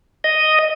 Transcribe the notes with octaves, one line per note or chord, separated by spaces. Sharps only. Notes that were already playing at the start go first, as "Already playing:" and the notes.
D#5